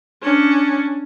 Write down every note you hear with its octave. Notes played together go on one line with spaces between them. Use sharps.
C#4 D4